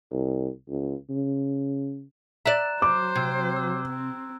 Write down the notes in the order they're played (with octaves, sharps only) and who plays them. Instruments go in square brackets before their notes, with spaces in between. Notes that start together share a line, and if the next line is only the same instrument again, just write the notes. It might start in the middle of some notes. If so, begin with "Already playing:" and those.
[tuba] C2
C#2
C#3
[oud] D5 E5 [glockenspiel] A#5 F#6 E7
[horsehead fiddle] F#3 C5 [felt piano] D6
[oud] C3 [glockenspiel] E6 G#6
[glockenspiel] E6
[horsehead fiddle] C4